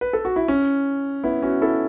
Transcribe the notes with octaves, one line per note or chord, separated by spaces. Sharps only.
B4
A4
F#4
E4
C#4
B3 E4
C#4 F#4
E4 A4